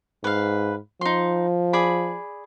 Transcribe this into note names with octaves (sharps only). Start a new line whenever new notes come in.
G#2 B4 F5
F3 D#4 C6
G#4 D5 B5